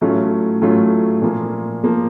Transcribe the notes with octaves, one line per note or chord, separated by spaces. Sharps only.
A2 F#3 A3 C#4 F4
A2 F#3 A3 C#4 F4
A#2 F3 A#3
A#2 F3 A#3